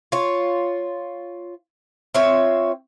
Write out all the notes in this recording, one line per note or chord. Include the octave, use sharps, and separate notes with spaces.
F4 C#5
C4 F4 C#5 E5